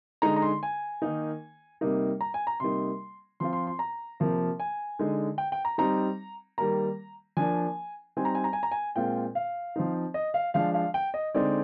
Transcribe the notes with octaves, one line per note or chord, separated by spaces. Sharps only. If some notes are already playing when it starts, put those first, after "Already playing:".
D3 G#3 D#4 A#5
A#5
C6
G#5
D#3 A#3 D#4
C3 G3 A#3 D#4
A#5
G#5
A#5
C3 G3 A#3 D#4 C6
F3 C4 F4 C6
C6
C6
A#5
C3 F3 A#3
G#5
D3 G#3 D#4
G5
G5
A#5
G3 C4 D#4 A#5
D#3 G3 A#3 A#5
F3 A#3 D4 G#5
G3 C4 D#4 G#5
A#5
G#5
A#5
G#5
A#5
G#5
A#2 G#3 C4 F4 G5
F5
F3 C4 D#4
D#5
F5
F3 G#3 D4 F5
F5
G5
D#5
D3 G#3 C4 D#4 D5